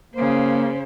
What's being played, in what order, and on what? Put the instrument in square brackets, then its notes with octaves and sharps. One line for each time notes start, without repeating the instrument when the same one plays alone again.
[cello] C#3 C5 [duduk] A#3